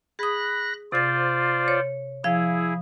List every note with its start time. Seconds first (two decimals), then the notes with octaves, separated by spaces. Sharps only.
0.19 G#4 B5 D#6 F#6 A#6
0.92 C3 F4 C5 D5 A6
1.68 C#5
2.24 F3 E4 G#4 F5